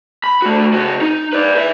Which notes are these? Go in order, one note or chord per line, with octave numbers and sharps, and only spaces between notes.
B5
A3 F#4
C#3 F#4
D#4
B4 D5
B4 E5